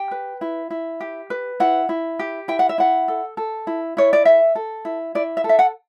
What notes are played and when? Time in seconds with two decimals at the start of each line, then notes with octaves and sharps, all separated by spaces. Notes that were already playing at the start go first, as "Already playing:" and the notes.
Already playing: G4 G5
0.11 B4
0.41 E4
0.70 E4
1.00 G4
1.30 B4
1.60 E4 F#5
1.89 E4
2.19 G4
2.48 E4 G5
2.59 F#5
2.69 E5
2.78 E4 F#5
3.08 A4
3.37 A4
3.67 E4
3.97 E4 C#5
4.13 D5
4.25 A4 E5
4.55 A4
4.85 E4
5.15 E4 D5
5.37 E5
5.44 A4
5.49 E5
5.59 F#5